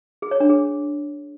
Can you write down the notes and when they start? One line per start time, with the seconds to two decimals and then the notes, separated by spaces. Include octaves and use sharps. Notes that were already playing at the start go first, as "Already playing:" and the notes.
0.22 G#4
0.31 C#5
0.40 D4
0.49 G#4